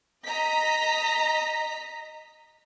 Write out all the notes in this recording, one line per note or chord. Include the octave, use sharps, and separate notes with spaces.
D#5 A#5 B6